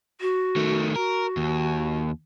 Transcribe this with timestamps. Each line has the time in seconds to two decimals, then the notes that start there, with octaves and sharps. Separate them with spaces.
0.21 F#4
0.56 D#3 A3
0.96 F#4 A#4
1.37 D#2